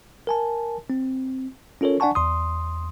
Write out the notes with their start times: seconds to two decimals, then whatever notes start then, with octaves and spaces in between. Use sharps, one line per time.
0.27 A#4 G#5 A5
0.90 C4
1.81 C#4 F4 A4 A#4 C#5
2.00 D4 D5 F#5 G#5 A5 C#6
2.15 E2 C6 D#6